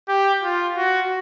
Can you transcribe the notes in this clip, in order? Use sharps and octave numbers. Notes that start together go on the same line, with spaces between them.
G4
F4
F#4